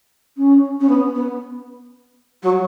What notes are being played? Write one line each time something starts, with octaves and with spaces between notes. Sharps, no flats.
C#4
C#4
B3
B3
F#3